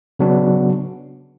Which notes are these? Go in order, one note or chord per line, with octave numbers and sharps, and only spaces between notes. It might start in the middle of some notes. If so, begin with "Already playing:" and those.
C#3 F#3 B3 D4 F#4